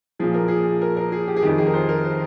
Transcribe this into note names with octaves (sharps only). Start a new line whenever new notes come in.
A#2 F3 G#4
A#4
G#4
A#4
A#4
G#4
G4
G#4
F2 D#3 G4
G#4
A#4
C5
A#4
C5